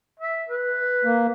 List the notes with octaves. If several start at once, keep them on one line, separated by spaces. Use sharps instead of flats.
E5
B4
A#3